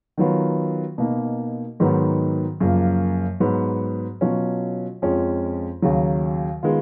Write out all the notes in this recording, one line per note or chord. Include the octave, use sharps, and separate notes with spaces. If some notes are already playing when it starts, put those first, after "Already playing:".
D#3 F#3 B3 F4
B2 A#3 D#4
G#2 D#3 F#3 B3
F#2 C#3 F3 A#3
G#2 F#3 B3
B2 F#3 C#4 F4
F2 F3 G#3 C#4
D#2 C#3 F#3
D#3 G#3 B3 F4